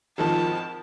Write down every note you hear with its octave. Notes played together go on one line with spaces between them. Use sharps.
G#1 D#3 F3 A5